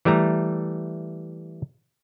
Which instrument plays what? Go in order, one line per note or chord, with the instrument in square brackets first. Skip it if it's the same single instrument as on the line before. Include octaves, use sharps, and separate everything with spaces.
[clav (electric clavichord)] E3 G3 A3 A#5